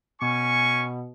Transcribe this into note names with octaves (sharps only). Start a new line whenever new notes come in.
B2 C#4 G#5 C#6